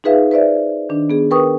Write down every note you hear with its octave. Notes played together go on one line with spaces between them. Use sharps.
D#4 F4 G#4 B4 E5 F5
B4 C5 D5 E5
D#3 D4
B3 G#4
A#4 B4 G5 C#6 D#6